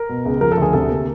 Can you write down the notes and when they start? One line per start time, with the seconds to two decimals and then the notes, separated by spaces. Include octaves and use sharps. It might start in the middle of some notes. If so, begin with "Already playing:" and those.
Already playing: A#4
0.09 B2
0.25 C#2
0.41 F3 A#4
0.52 A4
0.57 D2 G#4
0.73 C3 A4
0.90 A#3